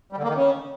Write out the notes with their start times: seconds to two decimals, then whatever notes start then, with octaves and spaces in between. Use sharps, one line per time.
0.12 G3
0.18 D3
0.23 A#3
0.28 D#3
0.34 C#3